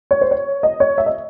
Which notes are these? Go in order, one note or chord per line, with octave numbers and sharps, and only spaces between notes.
C#5
C5
C#5
D#5
C#5
E5
D#5